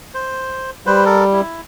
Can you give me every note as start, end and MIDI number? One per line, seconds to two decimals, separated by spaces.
0.14 0.71 72
0.86 1.41 55
0.86 1.05 71
0.86 1.05 72
1.06 1.24 69
1.06 1.24 70
1.33 1.61 64